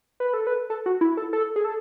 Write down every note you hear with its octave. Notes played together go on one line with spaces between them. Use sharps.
B4
A4
B4
A4
F#4
E4
A4
A4
G#4
A4